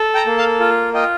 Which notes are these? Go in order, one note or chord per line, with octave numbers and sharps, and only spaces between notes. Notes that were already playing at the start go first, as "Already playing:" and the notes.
Already playing: A4
G5 A#5
A#3
F5 A5
F4
F4 D#5 G5